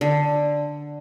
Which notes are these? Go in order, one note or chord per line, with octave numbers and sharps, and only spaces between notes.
D3